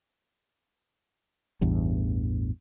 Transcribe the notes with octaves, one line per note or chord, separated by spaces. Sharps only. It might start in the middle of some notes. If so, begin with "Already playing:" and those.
A1 E2 G2